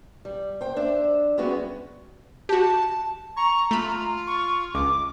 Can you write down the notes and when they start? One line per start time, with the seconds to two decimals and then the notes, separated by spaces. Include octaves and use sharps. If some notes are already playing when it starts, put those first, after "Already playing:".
0.25 G3
0.61 C5 G5
0.76 D4 C5 E5
1.38 G3 G#3 B3 C#4 F#4 G#4
2.49 F#4 G4 A5
3.36 A#5 C#6
3.71 A3 F4 B5
4.27 C#6
4.74 C#2 D6